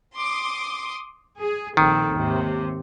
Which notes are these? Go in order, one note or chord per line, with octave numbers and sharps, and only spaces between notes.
C6 D6 D#6
G#4
A#1 D#3 C4 A4
D#2 G#2 C3